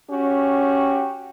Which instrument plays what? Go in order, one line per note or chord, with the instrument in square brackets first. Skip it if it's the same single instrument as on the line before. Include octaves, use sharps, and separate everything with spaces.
[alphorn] C#4 [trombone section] F#4 G4